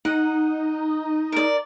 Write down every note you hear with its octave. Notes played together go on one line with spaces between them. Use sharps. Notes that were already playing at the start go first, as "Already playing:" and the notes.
D#4 F#5
A#4 D5